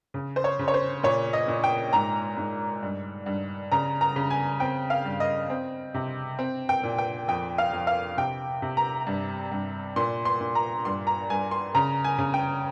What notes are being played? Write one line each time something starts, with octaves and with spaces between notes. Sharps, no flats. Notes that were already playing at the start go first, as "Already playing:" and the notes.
C#3
C5
C#5
C#3
C#5
C5
A#2 C#5
D#5
A#2
G5
G#2 A#5
G#2
G2
G2
C#3 A#5
A#5
C#3
G#5
C4 G5
F5
G2
D#5
C4
C3
C4
G5
A#2
G5
F2 G5
F5
F2
F5
C3 G5
C3
A#5
G2
G2
A#2 C6
C6
A#2
A#5
G2 C6
A#5
G2 G#5
C6
C#3 A#5
G#5
C#3
G5